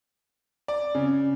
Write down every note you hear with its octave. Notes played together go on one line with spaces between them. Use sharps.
D5
C#3